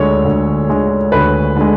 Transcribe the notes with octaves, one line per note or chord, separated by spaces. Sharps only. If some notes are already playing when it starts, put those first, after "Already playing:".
Already playing: D2 D3 G#3 C#5
D2
D3 G#3
D2 B4
D3 G#3